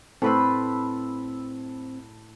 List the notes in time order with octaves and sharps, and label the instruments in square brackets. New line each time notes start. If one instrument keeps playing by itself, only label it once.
[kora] A2 B4 C5 [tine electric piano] C4 [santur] A5 B5 E6